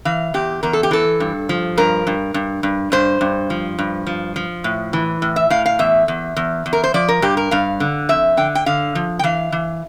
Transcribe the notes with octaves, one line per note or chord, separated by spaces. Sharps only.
E3 F5
E2 G4
E2 A#4
A4
G4
E3 A4
G2
F3
G2 A#4
G2
G2
G2
G2 C5
G2
F3
G2
F3
F3
A2
E3
A2
E5
A2 F5
F5
E2 E5
E2
E2
E2
A#4
C5
F3 D5
A#4
G2 G4
A#4
G2 F5
D3
F2 E5
D3 G5
G5
D3 F5
F3
G5
E3 F5
E3